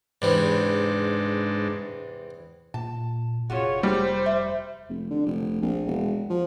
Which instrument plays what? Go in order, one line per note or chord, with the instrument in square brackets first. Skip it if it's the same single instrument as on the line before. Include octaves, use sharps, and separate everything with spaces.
[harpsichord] E2 C3 E3 [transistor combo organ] G#2 D4
[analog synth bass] A#2 [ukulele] A5
[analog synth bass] F1 [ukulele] C#4 F4 F#4 [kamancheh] G#4 C#5
[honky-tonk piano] G3 [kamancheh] C5 [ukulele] D#5
[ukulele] E5
[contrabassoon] F1
D3
F1
A#1
E1
F3